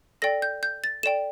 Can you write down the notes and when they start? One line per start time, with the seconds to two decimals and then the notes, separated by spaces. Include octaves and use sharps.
0.22 A4 D5 G5 A#6
0.42 G6
0.63 G6
0.84 A6
1.03 A4 D5 G5 E7